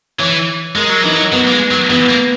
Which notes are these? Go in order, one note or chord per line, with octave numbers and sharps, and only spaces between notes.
E3 C#5
G#3 A#4
F#3
E3 D#4
F#3
F#3 B3
A#3
G#3
F#3
E3 B3
A#3